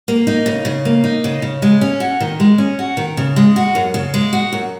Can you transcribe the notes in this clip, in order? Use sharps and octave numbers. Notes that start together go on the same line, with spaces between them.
A#3
D#4
C#3
C#3
A#3
D#4
C#3
C#3
G#3
C#4
F#4
D#3
G#3
C#4
F#4
D#3
C#3
G#3
F#4
F#2
C#3
G#3
F#4
F#2